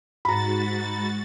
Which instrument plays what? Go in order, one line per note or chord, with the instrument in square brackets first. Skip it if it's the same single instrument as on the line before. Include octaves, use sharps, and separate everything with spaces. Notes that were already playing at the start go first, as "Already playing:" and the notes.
[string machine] G#2 F#4 A6 [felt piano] A#5 B5